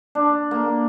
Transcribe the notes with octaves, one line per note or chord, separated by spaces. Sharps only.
D4
A#3